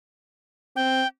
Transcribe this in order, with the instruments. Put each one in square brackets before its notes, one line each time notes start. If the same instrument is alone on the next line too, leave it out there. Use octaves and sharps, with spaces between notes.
[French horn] C4 [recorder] G5